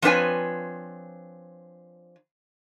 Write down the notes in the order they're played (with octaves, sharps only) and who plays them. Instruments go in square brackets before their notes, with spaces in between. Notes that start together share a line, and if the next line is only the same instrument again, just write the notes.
[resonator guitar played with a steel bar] F3 C4 D4 B4 C#5 G#5